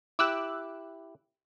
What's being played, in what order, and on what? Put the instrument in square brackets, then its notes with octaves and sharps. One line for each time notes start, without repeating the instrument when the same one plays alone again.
[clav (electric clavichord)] E4 G4 [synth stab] D6 E6 F#6